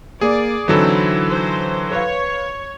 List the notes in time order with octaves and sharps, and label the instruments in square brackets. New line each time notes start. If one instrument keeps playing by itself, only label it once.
[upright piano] A#3 [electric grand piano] G#4 [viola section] D5
[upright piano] D3 D#4 [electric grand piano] E3 F#3 A4 [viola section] C4 E4
[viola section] C5
[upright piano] B4 F5 [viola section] C#5